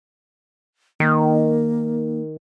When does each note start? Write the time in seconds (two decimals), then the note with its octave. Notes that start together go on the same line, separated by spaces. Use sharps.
1.00 D#3 A#3